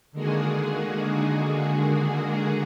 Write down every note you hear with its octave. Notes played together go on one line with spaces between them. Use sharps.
D3 D#3 G#3 A#3 F#4 G#4